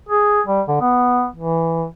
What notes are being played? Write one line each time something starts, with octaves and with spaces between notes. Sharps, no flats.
G#4
G3
D3
B3
E3